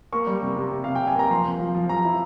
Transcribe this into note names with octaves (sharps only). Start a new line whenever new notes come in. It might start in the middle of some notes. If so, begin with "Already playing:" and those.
A#3 C#6
G3
C3
C3
C3
C3 F5
G5
C3
G#5
A#3 A#5
F3 C6
C4
F3
F3
F3 A#5
E4